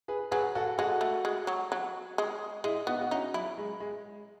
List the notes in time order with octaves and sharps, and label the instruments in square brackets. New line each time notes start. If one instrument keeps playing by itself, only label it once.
[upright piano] G#4 B4
[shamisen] F#3 [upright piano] G#4 B4
[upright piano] F#4 A4
[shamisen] G#3 [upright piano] F#4 A4
[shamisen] A3
G#3
F#3
F#3
G#3
[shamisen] G#3 [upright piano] E4 G#4
[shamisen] B3 [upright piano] D#4 F#4
[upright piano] F#4
[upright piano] C#4 E4 [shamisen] D#4
[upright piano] F#3 [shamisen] E4
[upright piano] G#3
G#3